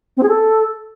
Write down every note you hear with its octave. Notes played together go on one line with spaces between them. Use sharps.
C4
G#4
A4